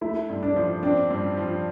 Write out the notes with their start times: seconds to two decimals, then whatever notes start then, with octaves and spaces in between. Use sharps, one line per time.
0.01 A3 E4
0.29 G2
0.43 D4
0.56 F3
0.83 C4 D4
1.11 G2
1.37 F3